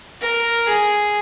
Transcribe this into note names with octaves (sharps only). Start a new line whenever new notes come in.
A#4
G#4